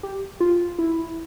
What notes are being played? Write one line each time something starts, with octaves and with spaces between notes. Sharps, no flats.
G4
F4
E4